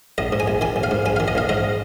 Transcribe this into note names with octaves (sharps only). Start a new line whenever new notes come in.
A#1 D#5
G#2
G#5
A#1
D#3 G#5
A#1
F5
G#2
A#1 G#5
D#3 F5
D#5
A#1 F5
G#2 D#5